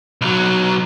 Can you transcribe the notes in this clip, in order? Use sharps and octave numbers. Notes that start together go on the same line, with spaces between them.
B1 F#3